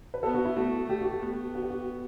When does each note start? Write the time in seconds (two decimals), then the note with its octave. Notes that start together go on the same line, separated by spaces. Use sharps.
0.14 B4
0.23 B3 A4
0.34 F#4
0.45 E4
0.57 A3 F#4
0.89 A3 G4
1.01 F#4
1.13 G4
1.22 B3
1.55 F#4
1.62 G4
1.70 F#4